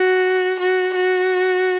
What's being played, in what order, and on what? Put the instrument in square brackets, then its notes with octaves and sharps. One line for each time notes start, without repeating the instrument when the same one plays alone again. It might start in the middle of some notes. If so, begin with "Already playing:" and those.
Already playing: [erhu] F#4
F#4
F#4